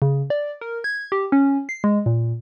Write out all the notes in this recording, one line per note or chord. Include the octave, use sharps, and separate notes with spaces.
C#3
D5
A#4
G#6
G4
C#4
C7
G#3
A#2